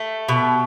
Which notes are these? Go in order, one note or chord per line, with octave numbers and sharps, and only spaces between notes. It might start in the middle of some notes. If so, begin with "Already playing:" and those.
Already playing: A3
B2